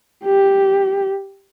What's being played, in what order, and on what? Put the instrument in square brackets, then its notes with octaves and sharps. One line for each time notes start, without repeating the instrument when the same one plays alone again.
[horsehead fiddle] G4